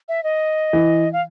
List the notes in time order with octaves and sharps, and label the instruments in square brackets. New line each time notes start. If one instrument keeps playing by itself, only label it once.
[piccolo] E5
D#5
[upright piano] E3
[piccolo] F5